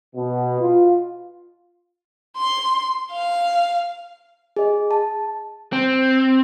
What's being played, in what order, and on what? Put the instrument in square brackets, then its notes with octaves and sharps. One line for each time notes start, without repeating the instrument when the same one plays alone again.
[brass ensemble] B2
F4
[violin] C6
F5
[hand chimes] G#4 D#5
A5
[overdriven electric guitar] C4